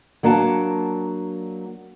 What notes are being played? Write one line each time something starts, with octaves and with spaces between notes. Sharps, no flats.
F#3 A#3 D4 F#5 A5